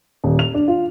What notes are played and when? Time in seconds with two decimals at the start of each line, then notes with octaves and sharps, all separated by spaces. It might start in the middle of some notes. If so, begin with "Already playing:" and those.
0.24 D#1
0.39 F7
0.54 D4
0.68 F4